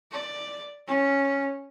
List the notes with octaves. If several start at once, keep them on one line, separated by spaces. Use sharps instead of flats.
D5
C#4